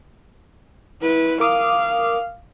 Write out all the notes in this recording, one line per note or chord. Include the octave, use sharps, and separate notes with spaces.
E4 B4
A#4 F5 D6 D#6